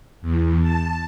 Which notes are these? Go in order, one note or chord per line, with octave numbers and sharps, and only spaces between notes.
E2
A5